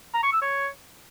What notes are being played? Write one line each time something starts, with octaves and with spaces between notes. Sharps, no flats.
A#5
C#6
E6
C#5